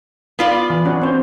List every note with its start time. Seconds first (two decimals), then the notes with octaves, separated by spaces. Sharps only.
0.39 B3 F4 D5
0.70 E3
0.85 C#4 D4 F#4
1.02 C4 C5